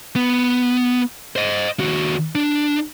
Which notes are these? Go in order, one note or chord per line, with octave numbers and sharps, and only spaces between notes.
B3
C5 D#5
D#2 F#4
D4